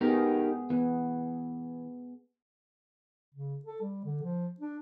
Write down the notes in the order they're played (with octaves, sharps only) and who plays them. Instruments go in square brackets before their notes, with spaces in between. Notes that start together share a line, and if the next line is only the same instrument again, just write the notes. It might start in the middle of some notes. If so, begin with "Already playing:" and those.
[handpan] B3 G#4 [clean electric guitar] D#4 G4 A#4
[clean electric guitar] E3 [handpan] B3
[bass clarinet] C#3
A4
G3
D3
F3
D4